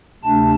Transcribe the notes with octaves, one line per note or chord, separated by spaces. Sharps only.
D2 C3 A3 D4 A5